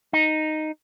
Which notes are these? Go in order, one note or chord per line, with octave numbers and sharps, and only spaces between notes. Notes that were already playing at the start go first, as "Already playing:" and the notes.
D#4